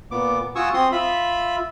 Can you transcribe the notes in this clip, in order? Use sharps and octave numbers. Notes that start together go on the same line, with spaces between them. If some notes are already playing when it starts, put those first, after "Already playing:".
A#2 B3 D6
F4 F#4 G#5 C#6 D#6 E6
C4 C6 D#6
F4 E5 B5